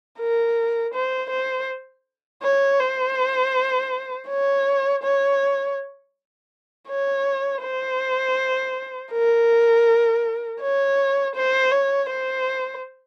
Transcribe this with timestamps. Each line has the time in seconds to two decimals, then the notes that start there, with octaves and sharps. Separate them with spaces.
0.19 A#4
0.94 C5
1.30 C5
2.43 C#5
2.80 C5
4.28 C#5
5.03 C#5
6.88 C#5
7.63 C5
9.12 A#4
10.61 C#5
11.36 C5
11.72 C#5
12.10 C5